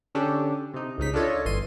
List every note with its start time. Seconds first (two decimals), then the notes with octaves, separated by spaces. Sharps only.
0.15 D3 C#4 D4 G4 A4
0.74 C3 D#4
0.98 C#2 C#3 D#4 B6
1.14 D4 F4 A4 C#5 D#5
1.45 G1 E3 C6 D#7